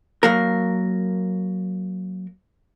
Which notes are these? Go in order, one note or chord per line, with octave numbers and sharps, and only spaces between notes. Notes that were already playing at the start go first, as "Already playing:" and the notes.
F#3 A#3 A#4